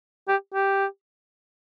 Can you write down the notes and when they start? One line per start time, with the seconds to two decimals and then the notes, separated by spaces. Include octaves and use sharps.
0.28 G4
0.54 G4